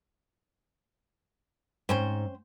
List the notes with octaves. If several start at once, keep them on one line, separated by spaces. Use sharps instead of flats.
G#2 C4 C#4 C5